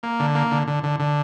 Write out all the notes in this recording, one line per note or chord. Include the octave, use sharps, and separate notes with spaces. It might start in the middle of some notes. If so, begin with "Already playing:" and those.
A#3
D3
A#3
D3
D3
D3
D3